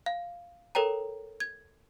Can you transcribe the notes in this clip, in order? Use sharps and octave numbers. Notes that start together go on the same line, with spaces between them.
F5
A4 A#4 C#5 G5 A#5
G#6